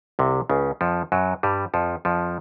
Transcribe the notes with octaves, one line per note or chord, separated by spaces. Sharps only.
C2 C3
C#2 C#3
F2 F3
F#2 F#3
G2 G3
F2 F3
F2 F3